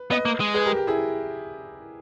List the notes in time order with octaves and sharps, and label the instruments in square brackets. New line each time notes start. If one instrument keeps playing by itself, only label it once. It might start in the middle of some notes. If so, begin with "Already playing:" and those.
Already playing: [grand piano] B4
[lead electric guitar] B3 [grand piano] B4 D#5
[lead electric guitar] A#3
G#3
[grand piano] G#4 B4
G4 A#4
G4
E4 G#4